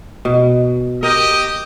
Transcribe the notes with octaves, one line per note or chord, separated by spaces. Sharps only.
B2
G4 A#4 D#5